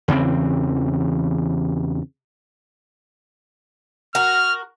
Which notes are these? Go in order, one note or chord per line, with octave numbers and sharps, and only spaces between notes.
E2 C#3 E3 C4
F#4 A#4 F6